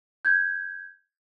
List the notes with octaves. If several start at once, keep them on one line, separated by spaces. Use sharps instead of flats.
G6 G#6